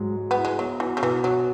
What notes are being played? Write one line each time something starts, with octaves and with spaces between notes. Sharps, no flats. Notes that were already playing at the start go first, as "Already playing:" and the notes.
Already playing: G#2 F#3 G#3
G#3
B3
E4
G#3
F#3 B3
E3 F#4
C#3
B2 E3
F#3 F#4